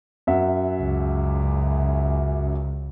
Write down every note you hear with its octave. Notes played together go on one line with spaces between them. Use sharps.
F#2 E5 F#5
C#2